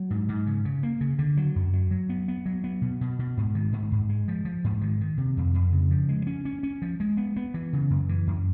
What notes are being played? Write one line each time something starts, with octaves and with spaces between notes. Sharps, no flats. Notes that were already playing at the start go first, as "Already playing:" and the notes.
Already playing: F#3
G#2
G#2
C#3
C#3
A#3
C#3
D3
F#3
F#2
F#3
F#3
B3
B3
F#3
B3
B2
B2
B2
G#2
D#3
G#2
G#2
G#3
F3
F3
G#2
D#3
D#3
C3
F2
F2
C#3
F3
G#3
C#4
C#4
C#4
F3
G#3
B3
B3
E3
C#3
F#2
E3
F#2